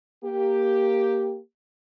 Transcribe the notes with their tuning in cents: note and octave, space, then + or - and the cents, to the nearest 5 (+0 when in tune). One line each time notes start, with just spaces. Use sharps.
A#3 +0 G4 +0